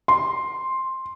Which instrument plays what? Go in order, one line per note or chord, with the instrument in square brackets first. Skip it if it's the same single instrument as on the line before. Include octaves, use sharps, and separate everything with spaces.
[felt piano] C6